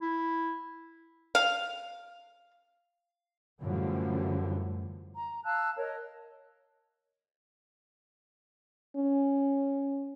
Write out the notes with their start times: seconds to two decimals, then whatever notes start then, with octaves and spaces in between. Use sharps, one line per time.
0.01 E4
1.35 F5
3.61 F#2 A2 D3 E3 F3 G3
5.16 A#5
5.44 F5 A5 E6 F#6
5.77 A#4 C#5 D#5
8.96 C#4